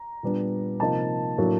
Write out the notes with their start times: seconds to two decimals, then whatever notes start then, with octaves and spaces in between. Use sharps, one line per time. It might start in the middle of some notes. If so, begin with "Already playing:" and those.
Already playing: A#5
0.23 A#2 G3 B3 D4
0.80 C3 F3 A#3 D#4 A5
1.38 A2 F#3 A#3 D4